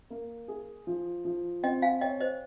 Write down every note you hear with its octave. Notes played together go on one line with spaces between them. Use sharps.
A#3
G#4
F3
F3
C4 D#5 G5
F5 G#5
C#5 D#5 G5
C5 D#5